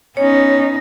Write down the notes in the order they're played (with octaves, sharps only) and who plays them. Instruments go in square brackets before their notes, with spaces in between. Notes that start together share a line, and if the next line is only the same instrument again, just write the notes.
[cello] B3 D#4 [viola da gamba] C#4 [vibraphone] C#5